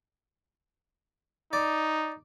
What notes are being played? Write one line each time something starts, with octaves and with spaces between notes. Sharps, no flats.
D#4 D5